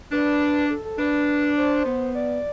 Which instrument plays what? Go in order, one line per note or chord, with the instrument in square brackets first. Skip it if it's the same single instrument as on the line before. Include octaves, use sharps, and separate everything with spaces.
[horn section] D4 [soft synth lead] B4
[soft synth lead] A4
A4
[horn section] D4 [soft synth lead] B4
[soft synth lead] C5
[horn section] B3
[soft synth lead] D5